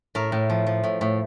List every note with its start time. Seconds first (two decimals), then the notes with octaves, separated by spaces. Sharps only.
0.15 A2 A#4
0.32 A2
0.50 F3
0.67 F3
0.83 A2
1.01 A2